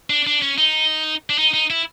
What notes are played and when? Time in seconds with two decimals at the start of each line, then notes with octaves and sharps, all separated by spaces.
0.10 D4
0.27 D4
0.42 C#4
0.58 D#4
1.30 D4
1.38 D#4
1.54 D#4
1.70 E4